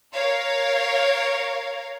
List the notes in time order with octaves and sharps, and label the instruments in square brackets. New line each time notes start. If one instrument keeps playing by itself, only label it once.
[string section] A#4 C#5 F5